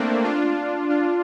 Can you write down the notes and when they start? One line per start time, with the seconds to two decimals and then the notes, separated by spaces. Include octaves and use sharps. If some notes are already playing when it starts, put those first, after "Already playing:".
Already playing: A3 A#3 C4 D4
0.24 D4 F4
0.89 D4 F4